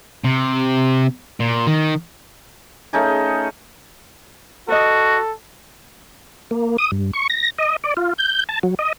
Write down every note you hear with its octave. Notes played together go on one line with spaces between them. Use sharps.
C3
A#2
D#3
A3 C#4 D#4 G#4
F#4 A4 B4 D5 D#5
A#3
D#6
G2
C#6
A#6
D#5
D5
F4
G6
A5
F#3
D#5